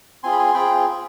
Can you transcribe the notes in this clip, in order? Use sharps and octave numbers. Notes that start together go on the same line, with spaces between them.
C4 F4 G#4 G#5 C6
B5
G#5 C6
C4 F4 G#4 G5 B5